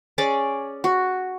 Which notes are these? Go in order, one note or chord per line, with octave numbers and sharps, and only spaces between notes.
C#4 G#4 D5 D6
F#4